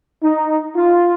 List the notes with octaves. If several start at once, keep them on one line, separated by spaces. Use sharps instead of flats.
D#4
F4